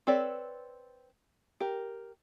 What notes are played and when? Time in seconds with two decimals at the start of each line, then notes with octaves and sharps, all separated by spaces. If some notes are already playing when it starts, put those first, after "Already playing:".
0.07 C4 A4 B4 C#5 D5
1.60 G4 A#4